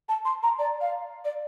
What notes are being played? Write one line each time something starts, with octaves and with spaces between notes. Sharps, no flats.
A5
C6
A#5
D5
F5
D5